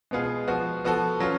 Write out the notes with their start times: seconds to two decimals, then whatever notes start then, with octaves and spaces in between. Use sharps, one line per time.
0.11 B2 G#3 B3 F4 G#4
0.48 F3 B3 F#4
0.84 F3 B3 F#4 A4
1.20 F#3 C#4 F4